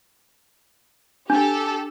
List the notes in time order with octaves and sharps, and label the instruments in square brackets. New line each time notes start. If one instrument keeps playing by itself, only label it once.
[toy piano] D4 [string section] G4 A4